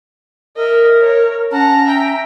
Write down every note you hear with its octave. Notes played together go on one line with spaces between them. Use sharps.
A#4 D#5 E5
C#5
C#4 F#5 A5 A#5
E5 G5